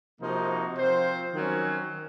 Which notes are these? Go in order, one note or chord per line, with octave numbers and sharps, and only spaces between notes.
C3 F3 A#3 D#4 F#4
F3 C4 F4 C5
D#3 F#3 C#4